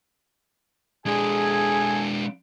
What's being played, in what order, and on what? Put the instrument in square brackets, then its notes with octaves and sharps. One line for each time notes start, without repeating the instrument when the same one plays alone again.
[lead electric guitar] G#3 D4 [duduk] G#4 [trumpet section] A4 G#5